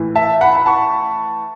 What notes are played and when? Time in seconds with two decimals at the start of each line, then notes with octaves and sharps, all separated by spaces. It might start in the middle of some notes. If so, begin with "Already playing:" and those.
Already playing: A2 E3
0.15 E5 A5
0.41 F#5 B5
0.55 B5
0.66 A5 C#6